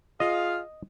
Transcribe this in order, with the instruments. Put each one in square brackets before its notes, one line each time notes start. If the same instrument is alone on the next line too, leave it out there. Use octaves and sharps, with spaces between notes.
[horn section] F4 G#4 F5 [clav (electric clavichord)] D#5